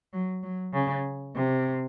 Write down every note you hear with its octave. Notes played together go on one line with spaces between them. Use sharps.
F#3
F#3
C#3
C3